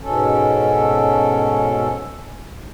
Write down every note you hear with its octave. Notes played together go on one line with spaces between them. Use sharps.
G#2 B2 C#4 A4
G#2